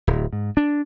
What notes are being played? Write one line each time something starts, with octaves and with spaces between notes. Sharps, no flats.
D1
G#2
D4